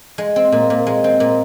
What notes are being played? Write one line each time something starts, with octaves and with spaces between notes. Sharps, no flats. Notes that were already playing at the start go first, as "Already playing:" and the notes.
G#3
C4
A#2
A#2
G#3
C4
A#2